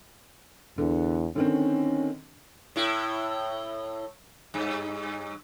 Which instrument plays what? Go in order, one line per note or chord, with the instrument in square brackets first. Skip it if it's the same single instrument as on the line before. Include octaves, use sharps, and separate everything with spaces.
[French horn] E2 [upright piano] D3
[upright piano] D3 D#3 C4 [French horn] C#4
[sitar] A2 E4
G2